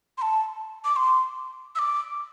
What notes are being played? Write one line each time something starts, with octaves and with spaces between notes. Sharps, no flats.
C6
A5
D6
C6
E6
D6